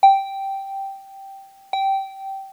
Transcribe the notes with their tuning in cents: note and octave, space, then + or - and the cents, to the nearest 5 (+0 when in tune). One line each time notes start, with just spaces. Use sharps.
G5 -5
G5 -15